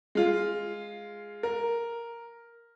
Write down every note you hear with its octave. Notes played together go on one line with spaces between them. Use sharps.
G#3 F4
A#4